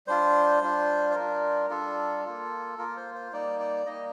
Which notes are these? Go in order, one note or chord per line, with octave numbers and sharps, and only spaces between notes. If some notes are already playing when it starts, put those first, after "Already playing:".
G3 D4 F4 C5
G3 D4 F4
C5
G3 D4 F4 A#4
G3 D4 F4 A4
A#3 F4
A#3 F4 A#4
C5
C5
G3 A#3 D#4 D5
D5
G3 A#3 D#4 D#5